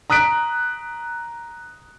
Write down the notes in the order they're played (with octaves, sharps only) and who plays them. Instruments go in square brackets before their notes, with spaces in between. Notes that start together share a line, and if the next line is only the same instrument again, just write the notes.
[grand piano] A#5 D#6 F#6 B6 D7